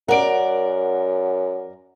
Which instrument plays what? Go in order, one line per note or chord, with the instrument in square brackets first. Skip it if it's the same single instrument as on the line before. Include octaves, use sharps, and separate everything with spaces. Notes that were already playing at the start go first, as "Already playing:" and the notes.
[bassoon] F#2 [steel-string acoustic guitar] A#4 D5 [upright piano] F#5 D7